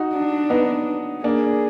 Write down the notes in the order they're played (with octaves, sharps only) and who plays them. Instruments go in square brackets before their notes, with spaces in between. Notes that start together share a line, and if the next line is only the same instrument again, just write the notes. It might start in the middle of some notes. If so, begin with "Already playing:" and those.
Already playing: [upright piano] D#4 F#4
[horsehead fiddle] D4
[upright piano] B3 D#4
[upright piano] A#3 D4 [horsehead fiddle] G#4